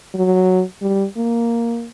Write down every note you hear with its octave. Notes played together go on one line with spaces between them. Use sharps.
F#3
G3
A#3